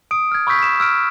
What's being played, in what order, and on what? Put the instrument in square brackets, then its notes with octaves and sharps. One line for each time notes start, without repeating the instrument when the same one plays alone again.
[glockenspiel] D#6 D7
F6 G#6
B5 C#6 E6 G6 B6
B6 E7
E6 F6 D7